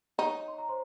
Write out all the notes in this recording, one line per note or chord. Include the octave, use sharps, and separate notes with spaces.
D#4 C#5 C#6
C6
A#5
C5 C6